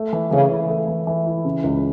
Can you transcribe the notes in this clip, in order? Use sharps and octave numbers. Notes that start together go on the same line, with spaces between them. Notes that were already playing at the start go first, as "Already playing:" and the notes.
Already playing: A3
E3
C#3 E3
E4
A3
E3
E3
E4
C#3
C#2